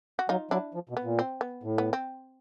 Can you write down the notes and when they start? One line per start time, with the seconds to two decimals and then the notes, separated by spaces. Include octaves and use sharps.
0.19 F#4
0.29 F#3 D#4 F4
0.51 F#3 D4 E4
0.74 F3
0.89 B2
0.97 B3
1.03 A#2
1.19 C4
1.41 B3
1.63 A2
1.78 B3
1.93 C4